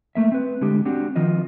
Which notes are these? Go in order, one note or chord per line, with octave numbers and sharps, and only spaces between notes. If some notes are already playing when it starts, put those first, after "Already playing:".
A3 A#3 E5
C4 B4
D3 G#3 G4
C4 D4 F#4 G4
D#3 F3 F4 D#5